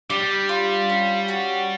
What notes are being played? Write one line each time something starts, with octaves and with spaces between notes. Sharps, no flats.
G3 D4
F4
C#4
F#4